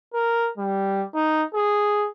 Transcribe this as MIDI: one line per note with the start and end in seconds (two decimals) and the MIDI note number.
0.14 0.50 70
0.58 1.03 55
1.14 1.43 63
1.54 2.07 68